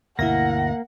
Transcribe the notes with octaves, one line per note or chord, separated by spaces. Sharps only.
D2 G2 B2 A#3 E4 E5 F#5 A#6